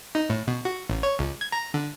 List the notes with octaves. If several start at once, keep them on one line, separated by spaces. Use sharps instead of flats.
D#4
A2
B2
F#4
A1
C#5
C#2
G#6
A#5
D3